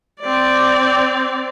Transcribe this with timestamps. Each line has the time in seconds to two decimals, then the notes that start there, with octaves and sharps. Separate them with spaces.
0.21 C4 D5